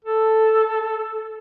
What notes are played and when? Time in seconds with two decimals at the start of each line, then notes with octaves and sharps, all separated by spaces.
0.04 A4